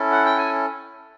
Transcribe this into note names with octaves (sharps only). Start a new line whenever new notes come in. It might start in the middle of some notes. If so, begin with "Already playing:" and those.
Already playing: C#4 E4 A4
F#5
G5
G#5